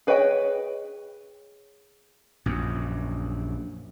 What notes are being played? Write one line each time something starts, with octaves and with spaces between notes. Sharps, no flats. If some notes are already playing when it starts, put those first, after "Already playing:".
G#4 B4 C#5 D#5 G5
A#1 F#2